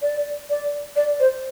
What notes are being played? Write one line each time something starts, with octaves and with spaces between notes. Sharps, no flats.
D5
D5
D5
C5